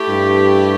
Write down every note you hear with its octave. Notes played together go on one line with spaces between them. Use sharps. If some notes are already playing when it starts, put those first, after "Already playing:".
Already playing: A3 E4 G4
G2